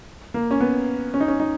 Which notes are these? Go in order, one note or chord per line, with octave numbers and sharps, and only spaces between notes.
A#3
C#4
B3
C#4
D#4
C#4
D#4